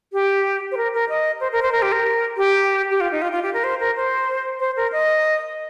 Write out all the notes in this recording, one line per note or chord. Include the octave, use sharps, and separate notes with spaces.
G4
C5
A#4
A#4
D#5
C5
A#4
C5
A#4
G4
A#4
G4
G4
F4
D#4
F4
F4
G4
A#4
C5
A#4
C5
C5
A#4
D#5